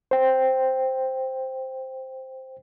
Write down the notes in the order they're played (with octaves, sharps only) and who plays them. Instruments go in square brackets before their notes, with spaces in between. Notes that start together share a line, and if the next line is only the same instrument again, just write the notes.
[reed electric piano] C5 G5